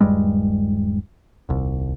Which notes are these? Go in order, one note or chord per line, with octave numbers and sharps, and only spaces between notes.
D#1 G2 G3 G#3
D#1 C2